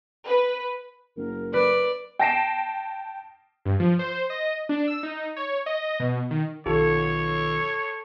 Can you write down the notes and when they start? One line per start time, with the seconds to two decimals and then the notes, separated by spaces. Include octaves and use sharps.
0.25 B4
1.17 F#1 A#4
1.54 B4 D5
2.19 G5 A5 A#6 C7 D7 E7
3.65 G2
3.80 F3
3.99 C5
4.30 D#5
4.69 D4
4.88 E6
5.03 D#4
5.36 C#5
5.66 D#5
6.00 B2
6.31 D#3
6.66 B1 D#3 F4 A4 C#5